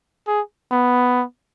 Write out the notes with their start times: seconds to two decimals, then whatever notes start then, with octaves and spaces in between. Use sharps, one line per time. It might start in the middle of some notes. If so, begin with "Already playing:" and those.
0.27 G#4
0.71 B3